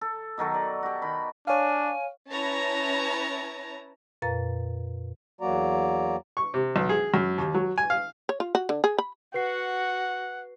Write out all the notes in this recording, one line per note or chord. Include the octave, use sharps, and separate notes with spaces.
A4
B2 D#3 F#3 A4
D5
F#4 G4
D#3 B5
D4 C#5 F5 G#5
C#4 E4 B4 C#5 A5 A#5
F2 A#2 B4 F5 A#5 A6
E2 F#3 A#3 F#4 D5 A#5
C#6
C3
B1
G#4
F#2
D#2
F#3
G#5
F5
C#5
F4
F#4
D3
G#4
B5
F#4 B4 F#5 C7